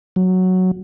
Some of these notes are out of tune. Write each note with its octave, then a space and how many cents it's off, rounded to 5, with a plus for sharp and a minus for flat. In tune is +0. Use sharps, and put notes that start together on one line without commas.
F#3 +0